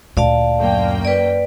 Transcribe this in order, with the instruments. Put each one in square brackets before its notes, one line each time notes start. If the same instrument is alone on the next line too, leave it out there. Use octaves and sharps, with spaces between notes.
[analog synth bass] D2 [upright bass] A#2 [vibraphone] D5 F5 A5
[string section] F#2 A#3 G5
[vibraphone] B4 D5